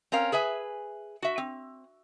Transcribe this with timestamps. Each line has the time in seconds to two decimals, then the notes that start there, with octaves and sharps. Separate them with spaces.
0.12 C4 C#4 A#4 F5
0.32 G#4 B4 E5 G#5
1.22 F#4 E5
1.38 C4